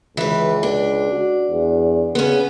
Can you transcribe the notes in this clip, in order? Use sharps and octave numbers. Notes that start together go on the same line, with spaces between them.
C#2 E3 B4
D4
F#4
E2
C#3 B3 C#4